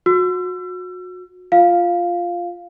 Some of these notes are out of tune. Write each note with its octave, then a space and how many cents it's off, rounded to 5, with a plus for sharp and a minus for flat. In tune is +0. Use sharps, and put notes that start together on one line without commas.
F#4 -30 E6 +35
F4 +0 F5 +0